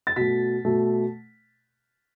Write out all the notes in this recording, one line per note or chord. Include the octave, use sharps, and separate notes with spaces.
A6
B2 A3 B6
B2 A3